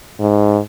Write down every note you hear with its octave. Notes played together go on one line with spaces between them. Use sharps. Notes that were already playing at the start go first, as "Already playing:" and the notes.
G#2